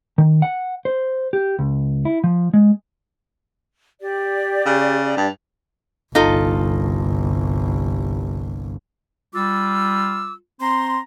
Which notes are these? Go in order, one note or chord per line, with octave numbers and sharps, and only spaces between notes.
D#3
F#5
C5
G4
C#2
E4
F3
G#3
G4 D5
C#3
G2
G1 C2 D#4 F4 A4
G3 F4 D6 E6
C4 A#5 C6